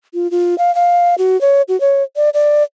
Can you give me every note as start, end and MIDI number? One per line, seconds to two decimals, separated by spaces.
0.14 0.30 65
0.31 0.58 65
0.58 0.74 77
0.75 1.15 77
1.18 1.39 66
1.41 1.62 73
1.68 1.79 66
1.81 2.03 73
2.16 2.30 74
2.34 2.63 74